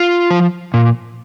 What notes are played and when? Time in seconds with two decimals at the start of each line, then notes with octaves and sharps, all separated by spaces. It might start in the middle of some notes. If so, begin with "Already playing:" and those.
Already playing: F4
0.30 F3
0.74 A#2